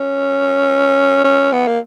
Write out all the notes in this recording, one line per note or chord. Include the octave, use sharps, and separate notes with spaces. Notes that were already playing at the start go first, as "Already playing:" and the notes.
Already playing: C#4
C#4
B3
A#3